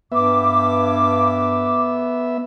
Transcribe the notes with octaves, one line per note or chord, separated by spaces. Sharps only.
G2 B3 E5 D6